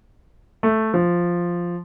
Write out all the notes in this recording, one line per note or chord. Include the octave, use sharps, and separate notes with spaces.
A3
F3